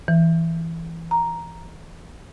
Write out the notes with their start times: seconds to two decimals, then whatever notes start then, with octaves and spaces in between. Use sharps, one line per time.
0.08 E3
1.11 A#5